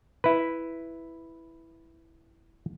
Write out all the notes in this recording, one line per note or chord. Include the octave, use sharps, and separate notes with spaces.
E4 B4